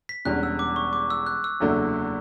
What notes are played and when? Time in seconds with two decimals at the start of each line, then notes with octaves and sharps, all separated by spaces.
0.09 B6
0.25 E1 E2 D3 G3 C#4 F#6
0.43 E6
0.59 D6
0.76 C#6
0.93 D6
1.10 E6
1.26 F#6
1.44 E6
1.60 F#1 E2 D3 F#3 A3